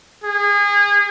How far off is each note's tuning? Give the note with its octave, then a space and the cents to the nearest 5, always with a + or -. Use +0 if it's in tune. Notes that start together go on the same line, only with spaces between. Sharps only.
G#4 -30